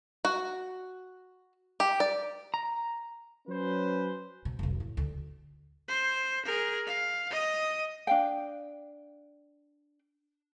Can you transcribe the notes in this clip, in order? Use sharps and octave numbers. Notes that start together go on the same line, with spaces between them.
F#4
G4
D5
A#5
F#3 C#4 B4 C5
B2
F1 B1
A2
D2
C5
G#4 A#4
F5
D#5 D#6
D4 F5 G5